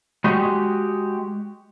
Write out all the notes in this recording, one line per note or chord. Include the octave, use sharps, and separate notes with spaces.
G#3 F#4 G4